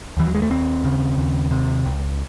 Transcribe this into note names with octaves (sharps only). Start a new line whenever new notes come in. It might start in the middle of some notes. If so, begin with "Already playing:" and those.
D#2 E3
F#3
G#3
A3
D#2 C4
C#3
D#2
C3
C#2